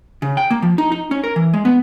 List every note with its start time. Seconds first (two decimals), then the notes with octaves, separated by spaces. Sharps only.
0.22 C#3
0.37 G5
0.50 A#3
0.62 F3
0.78 D#4
0.92 D#4
1.11 C#4
1.24 A#4
1.36 E3
1.53 G#3
1.65 B3